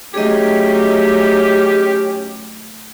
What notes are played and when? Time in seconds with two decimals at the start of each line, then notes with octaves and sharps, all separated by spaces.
0.14 F#3 A3 C#4 D#4 G4 G#4 D#5